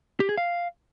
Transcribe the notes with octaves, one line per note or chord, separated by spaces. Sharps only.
G4
G#4
F5